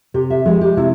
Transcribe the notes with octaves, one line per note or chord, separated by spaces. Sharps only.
C3 G4
E5
F3 G#3 G#4
G4
C3 E4